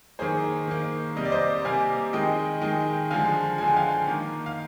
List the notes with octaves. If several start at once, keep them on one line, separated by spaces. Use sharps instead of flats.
D#3 A#3 G#4 C5
D#3 A#3
C3 G3 A#3 D#5
D5
C5 D#5
C3 G3 A#3 F5 G#5
D#3 G#3 D#5 G5
D#3 G#3 D#5 G5
D3 F3 G#3 F5 G#5
D3 F3 G#3 G#5
G5
F5 G#5
D#3 A#3
F5